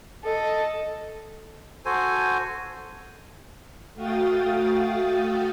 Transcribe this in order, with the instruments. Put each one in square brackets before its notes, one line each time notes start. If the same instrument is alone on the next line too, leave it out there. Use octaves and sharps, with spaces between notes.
[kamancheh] A4 D#5
[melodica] F#4 A4 C5 G#5
[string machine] A3 F#4 F5 G5 D#6 A6